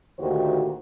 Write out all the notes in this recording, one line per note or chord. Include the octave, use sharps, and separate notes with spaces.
D2 A#2 D#3 F#4 G4 C5